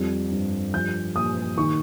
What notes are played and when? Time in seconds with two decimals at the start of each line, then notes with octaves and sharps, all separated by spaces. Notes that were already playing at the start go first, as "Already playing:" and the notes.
Already playing: F2 G3
0.31 G2
0.73 F3 G6
1.16 A#2 D#6
1.57 D#3 C#6